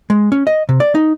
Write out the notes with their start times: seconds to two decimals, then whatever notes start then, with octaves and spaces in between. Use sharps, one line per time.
0.10 G#3
0.32 C#4
0.47 D#5
0.69 C3
0.80 D5
0.95 D#4